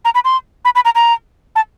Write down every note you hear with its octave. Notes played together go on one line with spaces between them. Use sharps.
A#5
B5
C6
B5
B5
A#5
A#5
A5